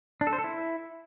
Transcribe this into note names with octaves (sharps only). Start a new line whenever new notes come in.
D4
A4
C5
A4
E4